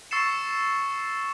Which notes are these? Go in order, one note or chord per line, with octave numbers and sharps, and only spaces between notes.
C#6 E6 A6 C7 C#7 E7